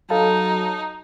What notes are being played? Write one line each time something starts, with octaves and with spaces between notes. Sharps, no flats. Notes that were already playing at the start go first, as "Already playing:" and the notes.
F#3 D#4 A4 F5 A5